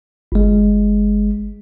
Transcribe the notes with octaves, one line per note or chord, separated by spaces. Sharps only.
G1 G#3